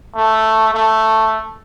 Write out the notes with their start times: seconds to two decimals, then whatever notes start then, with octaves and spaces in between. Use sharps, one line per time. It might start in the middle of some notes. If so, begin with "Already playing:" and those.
0.16 A3
0.74 A3